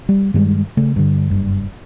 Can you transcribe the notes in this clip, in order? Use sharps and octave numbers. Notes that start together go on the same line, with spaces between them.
G3
G2 D#3 G3 G#3
C#3 A3
G2 D3
F#1 G2